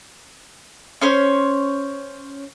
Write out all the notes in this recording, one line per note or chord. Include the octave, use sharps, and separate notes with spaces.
C#4 C5 C#5